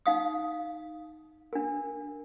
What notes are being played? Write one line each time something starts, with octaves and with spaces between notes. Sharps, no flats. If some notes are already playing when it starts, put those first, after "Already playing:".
D#4 F5 D#6
D4 A#4